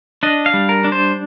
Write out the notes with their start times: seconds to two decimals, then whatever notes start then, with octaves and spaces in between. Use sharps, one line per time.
0.23 D4 D#5
0.46 F5
0.54 G3
0.69 A#4
0.84 D4
0.92 C5